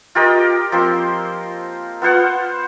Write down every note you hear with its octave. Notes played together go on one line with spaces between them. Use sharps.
F4 G4 A#4 D#5
F3 A#3 C4 C6
B3 F4 C5 F#5